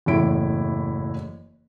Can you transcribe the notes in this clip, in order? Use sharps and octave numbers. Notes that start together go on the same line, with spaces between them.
F#1 E2 A2 E4 D7